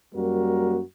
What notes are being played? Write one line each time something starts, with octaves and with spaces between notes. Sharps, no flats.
F#2 G3 A#3 F#4 A#4